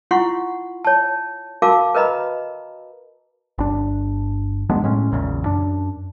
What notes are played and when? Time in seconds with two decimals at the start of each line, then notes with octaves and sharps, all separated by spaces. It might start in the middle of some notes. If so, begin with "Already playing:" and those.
0.11 E4 F4 F#5 C6 C#6
0.85 C#5 A5
1.62 F#4 A#4 F5 A5 D6
1.95 A#4 B4 D#5 A#5 B5
3.58 G1 D4
4.70 F#3 G#3 B3 D4
4.83 A2 G#3 C#4
5.12 A#1 E2 A#2 C#3
5.44 F#2 D4